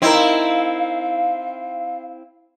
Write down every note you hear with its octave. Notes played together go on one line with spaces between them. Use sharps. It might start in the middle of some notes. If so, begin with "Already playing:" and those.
C4 D#4 E4 A#4 F5